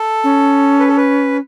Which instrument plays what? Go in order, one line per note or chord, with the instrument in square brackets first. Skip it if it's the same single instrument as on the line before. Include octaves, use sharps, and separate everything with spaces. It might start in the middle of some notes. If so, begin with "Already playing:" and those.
Already playing: [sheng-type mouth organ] A4
[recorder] C#4
[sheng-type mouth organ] B4
A4
B4